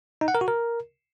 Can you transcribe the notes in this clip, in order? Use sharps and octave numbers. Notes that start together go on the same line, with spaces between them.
D#4
F#5
A#4
F#4
A#4